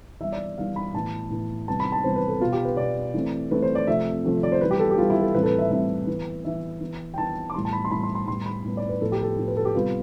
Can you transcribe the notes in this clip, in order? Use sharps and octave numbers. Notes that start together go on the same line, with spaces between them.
E3 G3 B3 E5
D5
E3 G3 B3 F5
B5
A2 E3 B3 A5
A2 E3 B3
C3 E3 G3 B3 A5
B5
A5
C3 E3 G3 B3 C5
B4
A4
B2 B3 F4
G4
B4
B2 D5
B3
E3 A3 C4
E3 A3 C4 B4
C5
D5
C3 F3 A3 C4 E5
C3 F3 A3 C4
D5
C5
E3 G3 B3 B4
G4
A4
G4
E3 G3 B3 F4
E4
A4
A2 E3 G3 C4 B4
A4
B4
E5
A2 E3 G3 C4 E5
E3 B3
E3 B3 E5
E3 B3
G5
E3 B3 A5
D6
A2 E3 G3 B3 C6
A5
B5
C6
A2 E3 G3 B3 B5
C6
C6
A2 G3 B3 C6
B5
A2 G3 B3
D5
B4
A2 F3 B3 A4
G4
A4
A2 F3 B3
B4
A4
G4
C3 G3 B3 F4